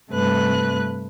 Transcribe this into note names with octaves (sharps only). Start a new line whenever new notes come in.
G2 C3 A3 B4 F#6